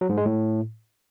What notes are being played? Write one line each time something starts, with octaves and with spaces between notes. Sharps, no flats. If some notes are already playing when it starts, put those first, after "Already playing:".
F#3
G#2
G#3
A2